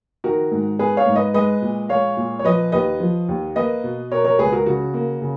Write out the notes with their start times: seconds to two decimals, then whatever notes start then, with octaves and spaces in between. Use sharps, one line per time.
0.24 D#3 F#4 A#4
0.51 G#2
0.79 B3 G#4 B4
0.97 C#5 F5
1.06 G#2
1.16 B4 D#5
1.34 G#3 B4 D#5
1.62 A#2
1.89 G#3 C#5 F5
2.17 A#2
2.39 C#5
2.45 F3 B4 D#5
2.72 D#2 B4 D#5
3.00 F3
3.28 D#2
3.56 A#3 B4 D#5
3.84 B2
4.11 B2 A#4 C#5
4.25 A#4 C#5
4.39 C#2 G#4 B4
4.52 F#4 A#4
4.66 C#3 F#4
4.94 A#3
5.22 C#3